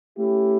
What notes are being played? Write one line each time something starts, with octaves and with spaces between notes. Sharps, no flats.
A3 C#4 E4 G4